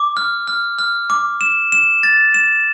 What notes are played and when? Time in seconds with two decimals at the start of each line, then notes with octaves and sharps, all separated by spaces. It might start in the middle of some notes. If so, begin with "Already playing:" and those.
Already playing: D6
0.17 F6
0.47 F6
0.79 F6
1.10 D6
1.41 E7
1.72 E7
2.03 A6
2.34 E7